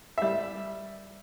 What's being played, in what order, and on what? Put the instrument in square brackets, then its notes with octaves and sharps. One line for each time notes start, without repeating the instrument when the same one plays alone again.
[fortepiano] G3 E5